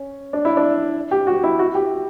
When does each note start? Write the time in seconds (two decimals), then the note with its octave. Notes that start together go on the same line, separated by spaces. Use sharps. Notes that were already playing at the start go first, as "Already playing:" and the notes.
Already playing: C#4
0.33 D4
0.45 E4
0.57 D4
1.11 G4
1.27 F#4
1.43 E4
1.59 F#4
1.75 G4